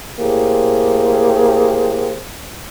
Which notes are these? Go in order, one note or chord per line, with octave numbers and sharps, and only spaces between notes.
A2 A#3 G4 G#4 C5